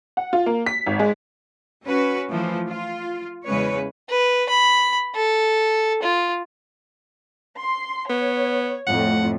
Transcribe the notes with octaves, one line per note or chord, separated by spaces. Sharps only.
F#5
F4
A#3
B6
G#1
G#3
C#4 F#4 B4
E3 F3 A3
F4
E2 C#3 G#3 B4 C#5
B4
B5
A4
F4
C6
B3 C#5
F2 A2 F#5